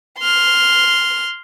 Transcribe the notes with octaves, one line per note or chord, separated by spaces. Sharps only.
C6 F6